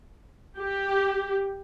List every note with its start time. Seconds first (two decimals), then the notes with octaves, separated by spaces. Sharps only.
0.57 G4